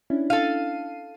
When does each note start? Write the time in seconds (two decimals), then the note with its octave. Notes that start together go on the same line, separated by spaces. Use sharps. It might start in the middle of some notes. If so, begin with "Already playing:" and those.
0.10 C#4 D4 E4
0.30 A4 F5 C7 D#7